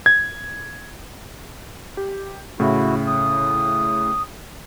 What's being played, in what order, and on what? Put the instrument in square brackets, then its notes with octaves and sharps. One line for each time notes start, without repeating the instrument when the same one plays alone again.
[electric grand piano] G#6
G4
[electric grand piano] A2 C#3 [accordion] E4 F#4
[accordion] D#6